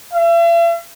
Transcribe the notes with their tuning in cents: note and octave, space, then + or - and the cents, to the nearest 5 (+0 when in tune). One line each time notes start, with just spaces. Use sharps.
E5 +45